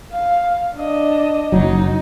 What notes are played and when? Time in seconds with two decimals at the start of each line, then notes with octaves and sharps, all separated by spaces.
0.12 F5
0.76 D4 D#5
1.52 F#1 F#3 D#4